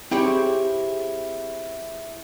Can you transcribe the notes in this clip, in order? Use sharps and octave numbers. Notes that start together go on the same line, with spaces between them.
C4 E4 G4 G#4 C#5